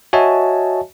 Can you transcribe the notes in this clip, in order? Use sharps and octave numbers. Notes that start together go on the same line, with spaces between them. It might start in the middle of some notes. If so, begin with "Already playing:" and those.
F#4 C#5 D#5 E5 G#5 A5